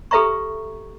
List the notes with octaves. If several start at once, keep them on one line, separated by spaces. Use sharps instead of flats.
G4 A4 B4 E5 A#5 C#6